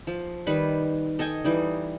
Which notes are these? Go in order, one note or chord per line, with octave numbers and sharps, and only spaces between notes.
F3
D#3 G3 B4 C#6
A4 D#5 G5 G#5
E3 G3 D#4